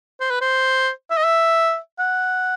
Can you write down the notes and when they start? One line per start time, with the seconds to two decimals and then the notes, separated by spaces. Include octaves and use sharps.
0.21 C5
0.30 B4
0.41 C5
1.10 E5
1.17 D#5
1.24 E5
1.99 F#5